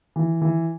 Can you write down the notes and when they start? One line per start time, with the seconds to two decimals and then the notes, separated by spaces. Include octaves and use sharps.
0.16 E3
0.42 E3